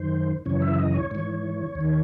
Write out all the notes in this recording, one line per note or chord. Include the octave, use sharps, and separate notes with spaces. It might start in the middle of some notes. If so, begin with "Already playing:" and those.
Already playing: F#2 D#3 C5
F#2 C#3 E3 C#5
E5
D#5
C#5
G#2 E3 C#5
D#2
D#3